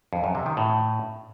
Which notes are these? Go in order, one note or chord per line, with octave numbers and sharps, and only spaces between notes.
F2
F#2
C3
D#3
A2